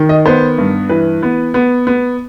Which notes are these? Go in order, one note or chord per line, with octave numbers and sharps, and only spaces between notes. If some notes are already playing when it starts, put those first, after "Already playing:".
Already playing: D#3
D#5
B3 C5
G2
E3 B4
B3
B3
B3